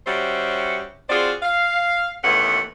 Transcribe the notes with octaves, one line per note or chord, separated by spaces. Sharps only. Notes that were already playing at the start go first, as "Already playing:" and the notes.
G3 C#4 F#4 G4 C5 E5
C4 F4 F#4 G#4 C5 D5
F5
D#2 E3 A3 B3 C#4 F#5